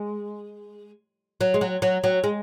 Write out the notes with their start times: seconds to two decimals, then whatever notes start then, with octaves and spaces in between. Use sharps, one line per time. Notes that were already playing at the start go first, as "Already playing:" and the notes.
Already playing: G#3
1.41 F#3
1.54 G#3
1.61 F#3
1.82 F#3
2.04 F#3
2.24 G#3